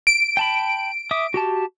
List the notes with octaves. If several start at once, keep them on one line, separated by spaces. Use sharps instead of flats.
D7
G5 A5 B5
E5 D6 D#6
F#4 G4 A5